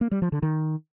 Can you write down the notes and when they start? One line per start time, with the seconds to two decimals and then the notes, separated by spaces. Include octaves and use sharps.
0.01 A#3
0.11 G3
0.22 F3
0.32 D3
0.42 D#3